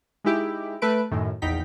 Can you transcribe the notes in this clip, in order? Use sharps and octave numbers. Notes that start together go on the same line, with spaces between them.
G#3 D#4 E4 G4
A3 B4 D7
F#2 A2 D#3
A#1 E2 D#4 G5 B6